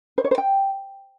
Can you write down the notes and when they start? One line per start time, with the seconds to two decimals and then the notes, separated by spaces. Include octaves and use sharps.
0.18 C5
0.24 C#5
0.31 C5
0.38 G5